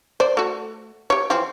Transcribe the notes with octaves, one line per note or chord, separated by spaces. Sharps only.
C5 D5
A3 F#4
G4 C#5
E3 F3 C4